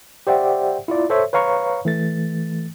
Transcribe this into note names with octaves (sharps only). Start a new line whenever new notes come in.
G4 C5 D5 E5 F#5 G5
E4 F4 D5
A4 C5 C#5 E5
B4 C#5 F5 A#5 C#6
E3 A3 A6